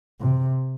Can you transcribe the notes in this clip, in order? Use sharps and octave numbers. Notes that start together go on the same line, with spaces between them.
C3